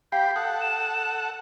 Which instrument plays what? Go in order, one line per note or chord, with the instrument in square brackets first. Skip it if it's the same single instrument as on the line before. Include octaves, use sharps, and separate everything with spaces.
[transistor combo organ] G4 B5 [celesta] F5 G5 C7 [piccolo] G6
[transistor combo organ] A4 F#5 [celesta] D#6
[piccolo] E7